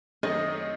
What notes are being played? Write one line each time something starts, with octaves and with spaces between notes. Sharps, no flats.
F#2 D#3 A3 C4 D#4 D#5